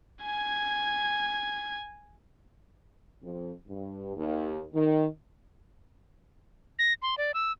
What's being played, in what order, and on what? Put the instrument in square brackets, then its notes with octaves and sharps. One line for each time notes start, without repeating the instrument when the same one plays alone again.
[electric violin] G#5 G#6
[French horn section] F2
G2
D#2
D#3
[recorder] A#6
C6
D5
E6